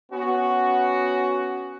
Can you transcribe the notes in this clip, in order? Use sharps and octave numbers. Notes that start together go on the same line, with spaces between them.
B3 C#4 F#4